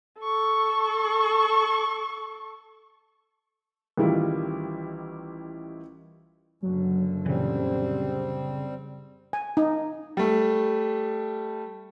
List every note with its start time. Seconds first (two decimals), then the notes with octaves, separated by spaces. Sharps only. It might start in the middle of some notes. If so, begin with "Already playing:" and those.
0.20 A4 C#6
3.97 A1 D#3 G3 E4 F4
6.63 F#1 D3 F#3
7.26 A#2 C#3 E3 G3 C4
9.33 G#5
9.57 D#4
10.17 G3 A3